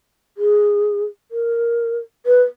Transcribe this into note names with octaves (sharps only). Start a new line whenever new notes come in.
G#4
A#4
B4